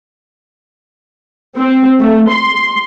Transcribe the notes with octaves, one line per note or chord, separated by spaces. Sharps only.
C4
A3
C6